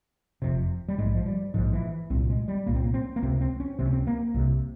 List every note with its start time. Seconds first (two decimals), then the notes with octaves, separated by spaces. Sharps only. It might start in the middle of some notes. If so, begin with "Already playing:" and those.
0.42 F1 F2 C3
0.89 G3
0.98 A#1 G#2 G#3
1.15 F3
1.26 G3
1.54 A#1 G#2 F3
1.73 E3
2.10 C2 A#2 C4
2.30 G#3
2.48 G3
2.66 C2 A#2 A#3
2.75 C4
2.84 A#3
2.94 C4
3.16 A#3
3.22 C#2 C3 C4
3.41 C4
3.60 C#4
3.79 C#2 C3 C4
3.85 C#4
3.93 C4
4.07 A#3
4.34 C2 C3